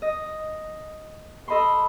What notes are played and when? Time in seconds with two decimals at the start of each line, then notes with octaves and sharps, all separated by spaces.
0.02 D#5
1.48 A4 D#5 B5 C6